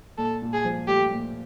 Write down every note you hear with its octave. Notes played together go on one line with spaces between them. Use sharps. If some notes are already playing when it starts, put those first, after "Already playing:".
A#2 A4
A#2
G#4
F3
A3 G4
A#2